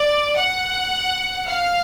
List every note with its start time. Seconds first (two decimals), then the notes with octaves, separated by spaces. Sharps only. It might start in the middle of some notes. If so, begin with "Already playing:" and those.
Already playing: D5
0.36 F#5
1.46 F5